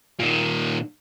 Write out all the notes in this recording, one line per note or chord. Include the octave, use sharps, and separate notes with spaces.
A#2 D#3